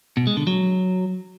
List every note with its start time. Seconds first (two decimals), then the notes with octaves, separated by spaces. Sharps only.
0.17 B2
0.27 G#3
0.37 D3
0.47 F#3